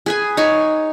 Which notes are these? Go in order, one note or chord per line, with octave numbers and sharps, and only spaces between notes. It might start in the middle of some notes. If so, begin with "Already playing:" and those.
G#4 B4 G#5
D#4 C#5 G#5